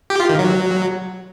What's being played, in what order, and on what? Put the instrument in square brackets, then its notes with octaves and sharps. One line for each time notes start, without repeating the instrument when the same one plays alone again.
[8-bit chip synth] G4
F4
D#3
F#3